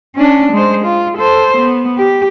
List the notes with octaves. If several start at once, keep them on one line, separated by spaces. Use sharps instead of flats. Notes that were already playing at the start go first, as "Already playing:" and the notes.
C#4 D4
G#3 C5
F4
A4 C5
B3
G4